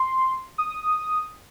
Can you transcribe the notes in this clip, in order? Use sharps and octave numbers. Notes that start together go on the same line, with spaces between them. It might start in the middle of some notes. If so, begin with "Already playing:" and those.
Already playing: C6
D#6